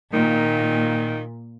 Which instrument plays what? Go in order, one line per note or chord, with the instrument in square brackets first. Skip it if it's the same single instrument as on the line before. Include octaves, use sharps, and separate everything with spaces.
[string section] A#2 [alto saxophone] D#3